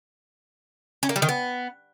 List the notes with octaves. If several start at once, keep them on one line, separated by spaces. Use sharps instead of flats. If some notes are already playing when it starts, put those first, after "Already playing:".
C#4
A#3
G3
D#3
B3